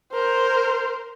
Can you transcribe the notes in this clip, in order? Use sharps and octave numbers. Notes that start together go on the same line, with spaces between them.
A#4 C5